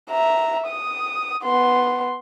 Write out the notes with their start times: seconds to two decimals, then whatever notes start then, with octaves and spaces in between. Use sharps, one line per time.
0.10 E5 A#5
0.67 D#6
1.44 B3 C6